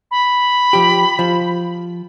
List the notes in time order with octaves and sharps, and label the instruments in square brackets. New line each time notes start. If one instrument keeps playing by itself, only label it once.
[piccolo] B5
[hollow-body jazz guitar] F3 G4
F3